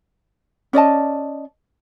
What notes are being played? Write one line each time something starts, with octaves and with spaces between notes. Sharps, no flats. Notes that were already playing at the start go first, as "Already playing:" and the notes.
C#4 D5 D#5 A5